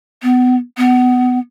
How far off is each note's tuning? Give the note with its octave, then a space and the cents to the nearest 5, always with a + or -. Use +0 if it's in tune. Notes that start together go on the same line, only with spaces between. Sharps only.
B3 +25
B3 +20